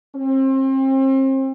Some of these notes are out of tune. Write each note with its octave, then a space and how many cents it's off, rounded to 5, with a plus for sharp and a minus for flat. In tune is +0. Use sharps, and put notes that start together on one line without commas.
C4 +35